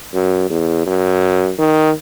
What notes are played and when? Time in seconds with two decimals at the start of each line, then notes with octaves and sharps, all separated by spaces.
0.14 F#2
0.50 E2
0.86 F#2
1.59 D#3